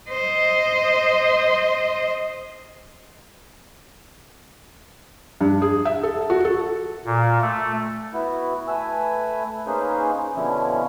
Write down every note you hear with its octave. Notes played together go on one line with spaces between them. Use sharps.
C5 D#5
G2
G#4
E5
A4
F#4
A4
A#2
A3
B3 E4 F#4
A3 B4 G#5 E6
A#3 C#4 D#4 G#4 B4 C5
B2 D3 F3 C#4 E4